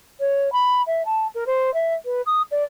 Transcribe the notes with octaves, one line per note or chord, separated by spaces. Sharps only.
C#5
B5
E5
A5
A#4
C5
E5
B4
D#6
D5